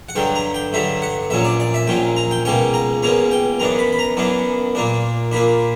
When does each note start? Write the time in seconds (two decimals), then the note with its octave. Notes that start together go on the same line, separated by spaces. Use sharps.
0.09 F#5
0.16 G2 D3 F#3 G5
0.35 A#5
0.54 G5
0.73 G2 D3 F#3 E5
1.02 F#5
1.30 A#1 A#2 F#3 C#4 E5
1.45 D5
1.60 D5
1.74 E5
1.87 A#1 A#2 F#3 C#4 G5
2.16 A#5
2.31 G5
2.45 C#2 B2 A#3 C#4 G5
2.74 A#5
3.03 C#2 B2 A#3 C#4 A#5
3.31 G5
3.60 F#2 E3 B3 D4 A#5
3.79 B5
3.93 B5
3.99 A#5
4.17 F#2 E3 B3 D4
4.75 A#2 A#3 D4
5.32 A#2 A#3 D4 B5